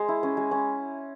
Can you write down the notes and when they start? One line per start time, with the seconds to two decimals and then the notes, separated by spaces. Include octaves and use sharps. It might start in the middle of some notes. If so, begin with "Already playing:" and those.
Already playing: G#3 C5
0.08 E4
0.23 C#4
0.37 G#3
0.51 C#4